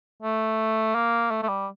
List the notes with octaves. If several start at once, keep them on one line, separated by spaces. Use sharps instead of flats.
A3
A#3
A3
A3
G3